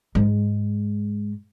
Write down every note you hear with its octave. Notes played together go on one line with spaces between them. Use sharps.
G#2 G#3